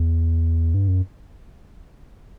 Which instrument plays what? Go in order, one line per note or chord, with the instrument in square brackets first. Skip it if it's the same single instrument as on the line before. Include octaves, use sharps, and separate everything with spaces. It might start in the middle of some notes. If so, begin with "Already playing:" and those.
Already playing: [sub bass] E2
G2
F#2